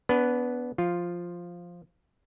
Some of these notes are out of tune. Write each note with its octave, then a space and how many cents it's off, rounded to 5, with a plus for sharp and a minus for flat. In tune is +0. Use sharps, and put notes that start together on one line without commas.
B3 +0 D4 -30 B4 +0
F3 +0 F4 +0